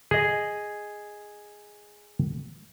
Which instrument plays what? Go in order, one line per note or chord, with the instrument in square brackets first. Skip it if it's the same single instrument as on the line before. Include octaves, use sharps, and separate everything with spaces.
[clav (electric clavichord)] G#4 D#5